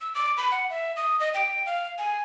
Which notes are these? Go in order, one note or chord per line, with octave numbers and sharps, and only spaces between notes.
E6
D6
B5
F#5
E5
D#6
D#5
G5
F5
G#5